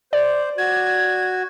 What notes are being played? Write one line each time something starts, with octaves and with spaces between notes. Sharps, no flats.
C5 D5
F#4 G#6